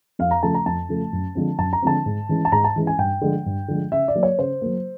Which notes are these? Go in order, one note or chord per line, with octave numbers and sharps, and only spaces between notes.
F2 F5
A#5
C#3 F3 A3 A5
A#5
F2 A5
C#3 F3 A3
F#2
D3 F3 G#3 C4
F#2 A5
A#5
D3 F3 G#3 C4 A5
G#2
E3 G#3 C#4
A5
G#2 A#5
A5
E3 G#3 C#4
G#5
G2 G5
D3 F3 G#3
G2
D3 F3 G#3
C#3 E5
D5
F#3 A#3
C#5
C#3 C5
F#3 A#3